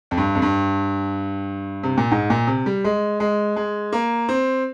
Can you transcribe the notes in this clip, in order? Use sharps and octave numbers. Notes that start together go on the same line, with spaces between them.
F2
G2
F2
G2
C3
A#2
G#2
A#2
C3
G3
G#3
G#3
G#3
A#3
C4